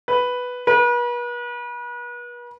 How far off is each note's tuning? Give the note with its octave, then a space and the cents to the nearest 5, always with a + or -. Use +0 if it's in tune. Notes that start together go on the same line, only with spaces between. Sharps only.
B4 +0
B4 -40